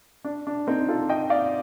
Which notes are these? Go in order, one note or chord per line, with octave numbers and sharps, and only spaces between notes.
D4
D4
C4 D#4
F4 A4
D#5 G5
D5 F5